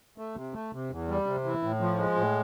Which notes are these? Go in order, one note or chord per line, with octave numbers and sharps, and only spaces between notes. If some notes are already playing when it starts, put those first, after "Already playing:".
A3
C3
A3
C3
E2
G3
C3
E3
A2
F3
G#3
A2